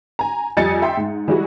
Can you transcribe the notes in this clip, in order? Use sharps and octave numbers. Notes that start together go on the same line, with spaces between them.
G#5 A#5
F2 G3 D#5 G#5 A6 C#7
E5 G5 C6
G#2
E3 G3 G#3 E4 F#4